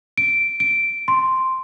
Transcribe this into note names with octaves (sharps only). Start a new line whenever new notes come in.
D7
D7
C6